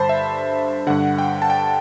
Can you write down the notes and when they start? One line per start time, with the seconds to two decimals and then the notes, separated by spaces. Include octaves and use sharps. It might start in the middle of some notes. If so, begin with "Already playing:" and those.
Already playing: G2 D3 C5 A5 B5
0.09 E5
0.87 G2 D3 F#5
1.18 G5
1.42 A5
1.50 G5